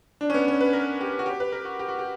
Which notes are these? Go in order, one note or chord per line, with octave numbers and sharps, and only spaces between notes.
D4
C#4
B3
C#4
B4
A#4
G4
F#4
G4
B4
A#4
F#4
G4
F#4
G4